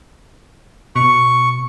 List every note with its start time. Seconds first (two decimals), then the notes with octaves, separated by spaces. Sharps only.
0.96 B2 C#6